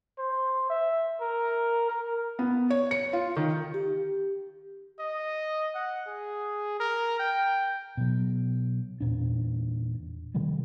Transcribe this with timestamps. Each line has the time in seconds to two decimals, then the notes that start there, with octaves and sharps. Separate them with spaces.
0.18 C5
0.70 E5
1.21 A#4
1.90 A#4
2.39 B3
2.70 C#5
2.91 C#7
3.13 F4
3.37 D#3
3.74 G4
5.00 D#5
5.75 F#5
6.07 G#4
6.80 A#4
7.19 G5
7.97 B2 F#3
9.00 E2 A#2 D4
10.34 C3 D#3 F3 G3